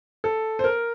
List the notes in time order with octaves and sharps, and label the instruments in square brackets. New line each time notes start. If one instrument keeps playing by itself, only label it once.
[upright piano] A4
C5
A#4